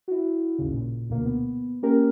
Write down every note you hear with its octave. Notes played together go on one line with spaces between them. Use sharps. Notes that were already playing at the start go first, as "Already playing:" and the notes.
E4 F#4
A1 D#2 C#3
A#2
D2 B2 A#3
B3
A#3 C#4 G4 A#4